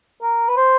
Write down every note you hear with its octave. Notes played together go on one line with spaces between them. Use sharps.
A#4
B4
C5